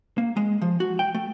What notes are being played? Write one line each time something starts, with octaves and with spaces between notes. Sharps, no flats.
A#3
G#3
F3
F#4
G5
A3